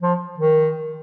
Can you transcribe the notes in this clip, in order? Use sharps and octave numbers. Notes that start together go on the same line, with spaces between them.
F3
D#3